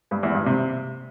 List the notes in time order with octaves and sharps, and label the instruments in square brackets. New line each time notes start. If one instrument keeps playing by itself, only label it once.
[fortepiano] G2
E2
G2
C3